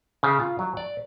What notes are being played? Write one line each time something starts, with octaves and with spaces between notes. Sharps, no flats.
C#3
F4
F#3
D5